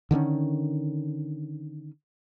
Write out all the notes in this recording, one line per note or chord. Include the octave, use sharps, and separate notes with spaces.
D3 D#3 A3 C#4